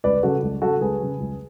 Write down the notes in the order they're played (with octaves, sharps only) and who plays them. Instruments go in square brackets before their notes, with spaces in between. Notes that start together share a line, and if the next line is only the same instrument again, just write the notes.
[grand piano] C#2 B4 D5
C#3 F#3 F#4 A4
C#2
C#3 F#3 F#4 A4
C#2 G#4 B4
C#3 F#3
C#2